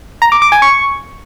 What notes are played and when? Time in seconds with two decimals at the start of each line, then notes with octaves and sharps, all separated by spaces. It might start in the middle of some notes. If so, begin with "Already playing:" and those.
0.22 A#5
0.32 D6
0.42 D6
0.52 G#5
0.62 C#6